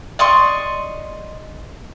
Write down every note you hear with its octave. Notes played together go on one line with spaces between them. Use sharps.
D5 D#5 C6 C#6